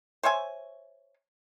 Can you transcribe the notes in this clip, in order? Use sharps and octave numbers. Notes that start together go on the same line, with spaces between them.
C5 C#5 E5 G#5